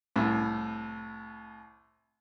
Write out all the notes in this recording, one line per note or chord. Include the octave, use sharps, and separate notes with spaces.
C2 A2